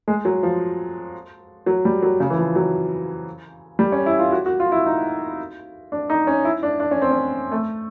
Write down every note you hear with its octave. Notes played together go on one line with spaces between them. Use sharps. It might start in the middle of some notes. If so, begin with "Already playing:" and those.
G#3
F#3
F3
F#3
G3
F#3
C#3
E3
F3
F#3
G3
C#4
E4
F4
F#4
F#4
F4
E4
D#4
D4
D#4
C#4
E4
D4
D4
C#4
C4
C#4
A3